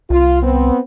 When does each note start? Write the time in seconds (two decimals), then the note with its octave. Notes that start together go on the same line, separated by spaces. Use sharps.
0.10 C2 F4
0.43 B3 C4